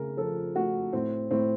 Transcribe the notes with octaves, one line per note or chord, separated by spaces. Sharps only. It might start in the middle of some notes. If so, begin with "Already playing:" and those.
Already playing: C#3 A3 A#4
F3 A4
A3 F#4
A2 C4
A2 C4